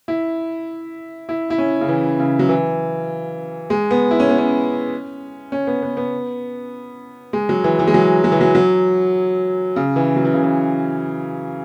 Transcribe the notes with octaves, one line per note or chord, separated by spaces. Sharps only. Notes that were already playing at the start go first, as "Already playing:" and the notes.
E4
E4
E4
C#4
C#3
E3
C#3
F#3
E3
G#3
B3
E4
C#4
B3
C#4
C#4
B3
B3
B3
G#3
F#3
E3
E3
G#3
F#3
F#3
E3
F#3
F#3
C#3
E3
F#3
E3
C#3
E3